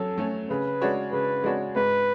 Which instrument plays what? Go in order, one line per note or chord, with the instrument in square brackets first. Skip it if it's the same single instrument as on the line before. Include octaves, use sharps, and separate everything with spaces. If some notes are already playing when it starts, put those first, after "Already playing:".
Already playing: [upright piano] F#3 C#4 [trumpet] A4
[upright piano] A3 C#4
[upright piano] C#3 [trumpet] B4
[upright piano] G#3 D4 F#4 C#5
[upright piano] C#3 [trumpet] B4
[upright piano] G#3 D4 F#4 C#5
[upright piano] G#2 [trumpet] B4